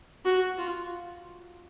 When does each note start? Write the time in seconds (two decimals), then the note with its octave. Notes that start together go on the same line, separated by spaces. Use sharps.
0.25 F#4
0.58 F4